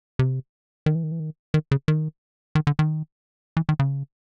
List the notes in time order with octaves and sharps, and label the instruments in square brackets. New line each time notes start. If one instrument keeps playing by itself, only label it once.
[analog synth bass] C3
D#3
E3
D#3
E3
D#3
D#3
C#3
D#3
D#3
D3
D#3
E3
D#3
C#3